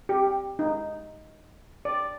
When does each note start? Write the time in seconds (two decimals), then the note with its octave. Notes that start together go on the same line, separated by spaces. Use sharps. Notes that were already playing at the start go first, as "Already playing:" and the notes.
0.09 G4
0.59 D#4
1.85 D5